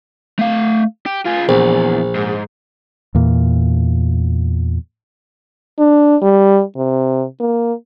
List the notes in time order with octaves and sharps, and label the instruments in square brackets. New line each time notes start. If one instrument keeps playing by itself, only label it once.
[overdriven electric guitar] A3 F5
G4
F4 G#4
[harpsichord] A#1 [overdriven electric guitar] E2
[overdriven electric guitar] G#2
[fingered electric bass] E2 A#2
[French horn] D4
G3
C3
A#3